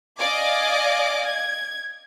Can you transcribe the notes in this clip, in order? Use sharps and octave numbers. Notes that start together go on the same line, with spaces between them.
D5 D#5 F5 G#5 D6
G#6